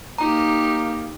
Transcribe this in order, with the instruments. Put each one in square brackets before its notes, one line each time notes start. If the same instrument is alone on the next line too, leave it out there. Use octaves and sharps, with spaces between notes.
[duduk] A#3 [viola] D#4 G4 [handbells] A#5